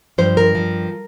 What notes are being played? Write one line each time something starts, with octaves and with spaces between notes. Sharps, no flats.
G2 F3 C5
A#4
G2 F3